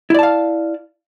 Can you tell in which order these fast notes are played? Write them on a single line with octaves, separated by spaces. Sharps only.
E4 D5 A5 F5